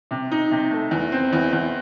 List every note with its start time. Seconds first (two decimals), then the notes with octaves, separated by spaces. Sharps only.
0.11 C3
0.31 D#4
0.51 C3
0.71 A3
0.91 E2
1.12 C4
1.33 E2
1.53 E2